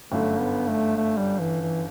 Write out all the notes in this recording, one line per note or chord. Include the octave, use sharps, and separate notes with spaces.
G1 F#2 D3 A3
B3
A3
A3
G3
E3
E3